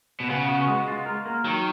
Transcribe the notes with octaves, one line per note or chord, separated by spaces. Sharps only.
B2
C#3 B3
F#4
G#3
F4
A#4
A#3
D#3 F#3